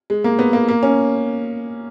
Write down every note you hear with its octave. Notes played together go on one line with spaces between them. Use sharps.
G#3
A#3
B3
A#3
A#3
C#4